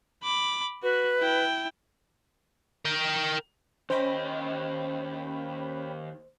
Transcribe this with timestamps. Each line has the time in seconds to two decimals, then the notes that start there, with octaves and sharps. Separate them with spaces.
0.23 B5 D6
0.83 F#4 B4
1.19 E4 G5
2.85 A#4 G5
3.90 D#2 C#4 C5 D#5 G5 B5